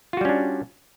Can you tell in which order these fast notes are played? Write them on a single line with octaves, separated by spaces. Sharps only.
F4 F#4 G3 C#4 D4